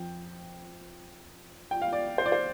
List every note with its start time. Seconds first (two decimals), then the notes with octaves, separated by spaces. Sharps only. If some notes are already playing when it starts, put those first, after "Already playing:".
Already playing: F2 F3 G5
1.71 G5
1.82 F5
1.93 D5
2.18 C5
2.26 D5
2.32 C5